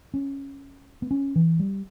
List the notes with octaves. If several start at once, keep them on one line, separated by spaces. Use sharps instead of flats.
C#4
B3
C#4
E3
G3